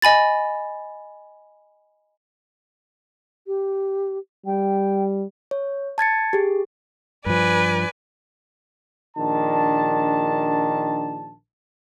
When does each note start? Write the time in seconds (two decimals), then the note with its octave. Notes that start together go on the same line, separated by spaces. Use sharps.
0.02 D#5 G#5 B5 A6
3.47 G4
4.46 G3 G5
5.51 C#5
5.98 A5 G#6 A6 C#7
6.33 G4 G#4
7.26 G2 F3 B4 D5 G#5
9.17 A#1 D#3 D4 A5